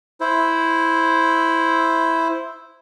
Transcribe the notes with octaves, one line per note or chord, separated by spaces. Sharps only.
E4 C5